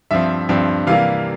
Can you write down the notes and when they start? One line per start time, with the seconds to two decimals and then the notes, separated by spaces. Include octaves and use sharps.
0.11 G2 F3 C4 E5
0.49 G2 F3 C4
0.87 C3 E3 G3 A#3 F5